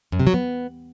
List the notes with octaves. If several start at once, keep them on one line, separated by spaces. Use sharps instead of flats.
F#2
C3
F#3
B3